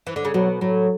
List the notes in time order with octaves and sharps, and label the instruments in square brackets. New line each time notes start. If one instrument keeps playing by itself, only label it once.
[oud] E3
D3
C#3
[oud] B2 [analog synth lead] F#3
[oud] A2 [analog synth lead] F#3